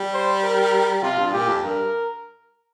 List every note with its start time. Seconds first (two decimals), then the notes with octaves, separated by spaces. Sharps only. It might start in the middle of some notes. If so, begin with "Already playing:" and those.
Already playing: G3
0.14 C5
0.43 A#4
1.03 C3 F4
1.18 G2
1.33 A#2 G4
1.48 F2
1.63 G2 A#4